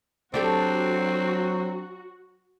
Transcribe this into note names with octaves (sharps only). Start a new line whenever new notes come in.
F#3 C4 D4 F#4 G4 A4